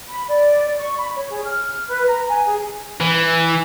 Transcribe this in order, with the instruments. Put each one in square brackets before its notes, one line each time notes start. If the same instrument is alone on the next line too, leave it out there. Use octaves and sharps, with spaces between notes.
[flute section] B5
D5
D5
C#6
B5
C#5
G#4
F6
B4
A#5
G#5
G#4
[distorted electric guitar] E3